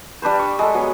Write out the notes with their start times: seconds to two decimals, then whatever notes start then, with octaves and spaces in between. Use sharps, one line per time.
0.22 G3 D4 B4 C5
0.39 C#6
0.59 G#3 A4
0.74 F#3 B3 G#5